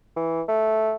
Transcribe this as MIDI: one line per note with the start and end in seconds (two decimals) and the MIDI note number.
0.16 0.42 52
0.48 0.96 57